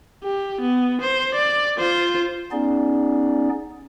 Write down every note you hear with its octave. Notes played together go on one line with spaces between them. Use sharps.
G4
B3
C5
D5
F4 C5
B3 C#4 D#4 G#4 D5